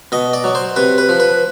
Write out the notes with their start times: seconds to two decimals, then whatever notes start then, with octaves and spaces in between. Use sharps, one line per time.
0.12 B2 D#5
0.33 D5
0.44 F#3
0.55 C5
0.76 C3 B4
0.98 B4
1.09 F3
1.20 B4